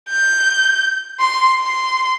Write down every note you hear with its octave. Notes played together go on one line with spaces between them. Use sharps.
G6
C6
C6